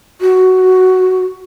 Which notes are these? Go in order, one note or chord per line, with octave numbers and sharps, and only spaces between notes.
F#4